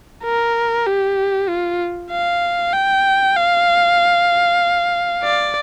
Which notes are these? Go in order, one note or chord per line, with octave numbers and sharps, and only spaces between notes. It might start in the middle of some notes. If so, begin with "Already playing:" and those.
A#4
G4
F4
F5
G5
F5
D5